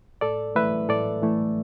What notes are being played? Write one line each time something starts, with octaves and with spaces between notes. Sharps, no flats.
A2 A4 D5
E3 A3 E4 B4 E5
A2 A4 D5
E3 A3 E4